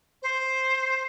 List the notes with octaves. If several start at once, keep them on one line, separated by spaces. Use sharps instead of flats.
C5